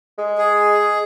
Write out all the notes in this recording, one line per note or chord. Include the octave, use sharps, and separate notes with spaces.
G#3
G#4